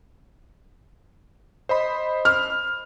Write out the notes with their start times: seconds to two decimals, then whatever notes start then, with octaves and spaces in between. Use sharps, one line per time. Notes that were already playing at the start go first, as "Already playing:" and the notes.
1.69 C5 D#5 B5
2.25 F6